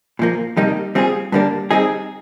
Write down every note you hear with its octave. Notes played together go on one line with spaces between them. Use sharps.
A#2 F3 A#3
F2 C3 G3 A#3 D#4
G3 C4 F4 G#4
G2 D3 G3 A#3 D4
G3 C4 D#4 G#4